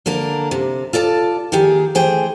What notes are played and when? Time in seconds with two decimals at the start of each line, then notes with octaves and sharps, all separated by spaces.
0.06 D3 A#3 D4 A#4
0.51 C3
0.93 F4 A4 D5 A5
1.52 D#3 A#3 G4 G#4
1.95 E3 A3 G#4 C5 G5